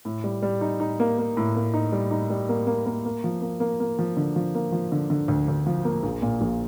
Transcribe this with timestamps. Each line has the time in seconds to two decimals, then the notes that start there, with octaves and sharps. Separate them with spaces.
0.05 A2
0.24 G3
0.42 G3
0.61 D#4
0.80 D#4
1.00 A#3
1.18 A#3
1.37 A2
1.56 A#3
1.74 D#4
1.92 G3
2.11 D#4
2.30 G3
2.49 A#3
2.67 A#3
2.86 A#3
3.05 A#3
3.24 F3
3.41 A#3
3.60 A#3
3.80 A#3
3.99 F3
4.17 D3
4.36 F3
4.55 A#3
4.72 F3
4.92 D3
5.10 D3
5.28 D2
5.48 D2
5.67 F3
5.85 A#3
6.03 A#1
6.22 A#2
6.41 A#1